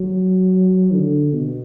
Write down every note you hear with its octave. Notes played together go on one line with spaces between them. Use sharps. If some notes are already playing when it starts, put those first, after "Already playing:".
Already playing: F#3
D3
B2